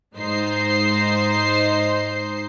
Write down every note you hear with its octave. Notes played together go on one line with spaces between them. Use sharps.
G#2 D#4 C5 C7